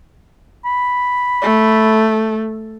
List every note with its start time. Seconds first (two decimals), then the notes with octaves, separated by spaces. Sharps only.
0.65 B5
1.42 A3